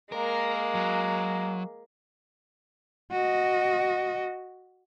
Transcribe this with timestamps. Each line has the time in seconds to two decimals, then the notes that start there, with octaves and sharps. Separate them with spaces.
0.12 G#3 A#3 A#4
0.75 F#3
3.11 F#4 D#5